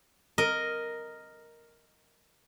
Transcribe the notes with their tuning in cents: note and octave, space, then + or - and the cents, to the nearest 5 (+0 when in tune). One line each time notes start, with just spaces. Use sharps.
A#4 +0 D#5 +0